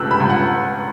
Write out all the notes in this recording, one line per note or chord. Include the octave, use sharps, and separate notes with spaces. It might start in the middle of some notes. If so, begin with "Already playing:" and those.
Already playing: C#2 B2 A3 E6 F#6
B5
C#2
F#5